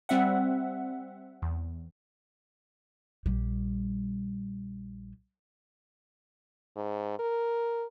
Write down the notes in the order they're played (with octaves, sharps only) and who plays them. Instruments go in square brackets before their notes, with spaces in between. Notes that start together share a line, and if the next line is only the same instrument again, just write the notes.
[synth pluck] G3 C4 E5 F#5
E2
[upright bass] A#1 G3
[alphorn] G#2
A#4